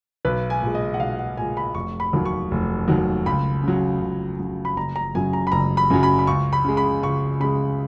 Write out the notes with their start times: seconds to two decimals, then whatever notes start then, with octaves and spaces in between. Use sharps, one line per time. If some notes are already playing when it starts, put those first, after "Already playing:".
0.25 B1 B4
0.50 G#5
0.62 A#2
0.67 G#3
0.75 D#5
0.94 F#5
0.99 B1 F5
1.19 F#5
1.37 A#2 G#3 G#5
1.57 B5
1.75 F1 C#6
2.00 B5
2.13 D#2 D#3 F#3
2.25 C#6
2.51 F1
2.88 D#2 D#3 F#3
3.26 C#2 B5
3.63 C#3 F#3
4.01 C#2
4.39 C#3 F#3
4.65 B5
4.76 F#1 A#5
4.96 A#5
5.15 F#2 C#3 F#3 G#5
5.33 A#5
5.47 B5
5.52 F#1 A#5
5.77 B5
5.90 F#2 C#3 F#3
6.03 B5
6.19 B5
6.27 C#2 C#6
6.53 B5
6.65 C#3 G#3
6.77 B5
7.03 C#2 C#6
7.40 C#3 G#3 B5